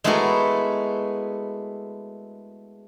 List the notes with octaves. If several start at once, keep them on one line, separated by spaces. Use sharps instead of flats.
G#3 A3 B3 E4 F#4 A#4